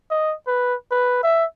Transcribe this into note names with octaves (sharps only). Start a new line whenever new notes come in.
D#5
B4
B4
E5